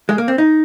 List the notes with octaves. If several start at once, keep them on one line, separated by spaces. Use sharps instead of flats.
G#3
A#3
C4
D#4